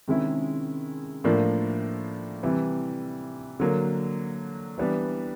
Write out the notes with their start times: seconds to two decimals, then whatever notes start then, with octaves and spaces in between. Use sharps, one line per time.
0.07 C3 D#3 G#3 C#4 E4
1.24 A2 F3 A#3 D4
2.43 C3 E3 G3
3.60 D3 F#3 A#3
4.78 E3 G3 B3 D4